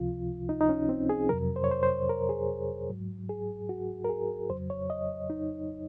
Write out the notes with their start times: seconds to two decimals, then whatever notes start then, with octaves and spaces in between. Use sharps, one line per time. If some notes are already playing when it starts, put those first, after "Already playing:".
Already playing: C#2 C3 F3 F4
0.49 D#4
0.61 D#4
0.69 C#4
0.89 C4
1.09 G#4
1.29 F2 C3 F#3 A#4
1.56 C5
1.64 C#5
1.71 C5
1.83 C5
2.09 A#4
2.29 G#4
2.89 G#2 F#3
3.29 G#4
3.69 F#4
4.04 A#4
4.09 G#4
4.50 F2 C#3 F#3 C5
4.70 C#5
4.90 D#5
5.30 D#4